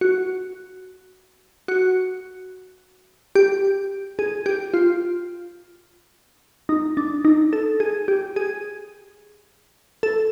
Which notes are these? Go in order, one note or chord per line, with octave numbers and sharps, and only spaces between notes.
F#4
F#4
G4
G#4
G4
F4
D#4
D4
D#4
A4
G#4
G4
G#4
A4